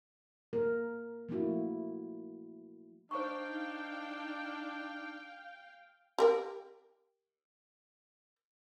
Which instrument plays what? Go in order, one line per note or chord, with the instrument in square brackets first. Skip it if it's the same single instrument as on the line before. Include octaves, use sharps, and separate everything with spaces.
[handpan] A#3 A#4
F3 A3 A#3 E4 F#4
[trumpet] D4 [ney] D#4 [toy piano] C5 A#5 C#6 [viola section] F5 G5
[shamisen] G4 A#4 G5